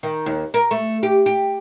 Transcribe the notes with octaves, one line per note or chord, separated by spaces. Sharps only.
D#3
D#2
A#4
A3
G4
G4